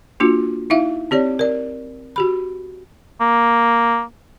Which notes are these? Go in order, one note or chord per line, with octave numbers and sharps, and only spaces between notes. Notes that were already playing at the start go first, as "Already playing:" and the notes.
A#3 D4 F4 F#4
D#4 E4 E5 F5
C4 G4 C#5 D5
A#4 D5
F#4 G4 B5
A#3